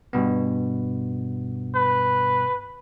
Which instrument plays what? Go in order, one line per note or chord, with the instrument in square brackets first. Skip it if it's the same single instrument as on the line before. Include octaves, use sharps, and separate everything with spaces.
[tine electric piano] G2 B2 B3
[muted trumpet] B4